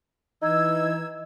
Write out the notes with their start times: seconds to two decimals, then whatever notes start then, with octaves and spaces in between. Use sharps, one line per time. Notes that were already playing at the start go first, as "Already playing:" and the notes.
0.42 E3 D#4 E6 G#6